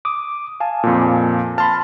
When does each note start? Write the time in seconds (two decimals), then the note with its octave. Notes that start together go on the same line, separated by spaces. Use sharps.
0.05 D6 D#6
0.60 F5 G#5 A5
0.83 F2 A#2
1.58 A5 B5 C6 F6